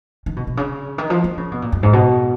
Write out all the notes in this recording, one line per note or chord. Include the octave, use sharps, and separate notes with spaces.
D#3
B2
B2
C#3
D#3
F3
F3
C#3
B2
A#2
F#2
G#2
B2